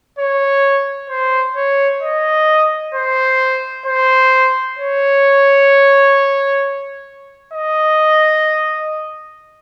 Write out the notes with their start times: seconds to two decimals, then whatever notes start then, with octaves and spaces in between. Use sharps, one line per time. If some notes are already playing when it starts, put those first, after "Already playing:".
0.19 C#5
1.10 C5
1.56 C#5
2.03 D#5
2.94 C5
3.86 C5
4.78 C#5
7.53 D#5